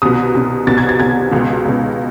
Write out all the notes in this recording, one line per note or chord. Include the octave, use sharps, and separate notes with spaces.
C2 B2 D#6
C2 B2
C2 B2 A6
G#6
A6
C2 B2 G#6
C#2 B2
C#2 B2